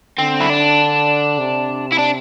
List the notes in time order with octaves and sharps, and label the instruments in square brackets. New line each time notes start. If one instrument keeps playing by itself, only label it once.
[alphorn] D3 [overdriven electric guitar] C4
[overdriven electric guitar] E4
D4
[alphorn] C3
[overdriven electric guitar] E4
D4